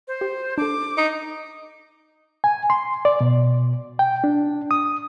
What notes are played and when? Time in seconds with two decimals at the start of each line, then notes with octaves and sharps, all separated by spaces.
0.08 C5
0.21 G4
0.58 D4 A4 D6
0.98 D#4
2.44 G#5
2.70 C6
3.05 D5
3.21 B2
3.99 G5
4.24 D4
4.71 D#6